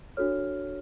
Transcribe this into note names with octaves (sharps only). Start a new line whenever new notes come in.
D4 F#4 A4 C#5 F6